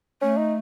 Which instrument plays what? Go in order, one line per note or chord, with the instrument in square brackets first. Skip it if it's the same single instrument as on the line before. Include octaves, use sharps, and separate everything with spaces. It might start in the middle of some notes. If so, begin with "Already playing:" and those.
[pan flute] A3 [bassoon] C#4
[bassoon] D#4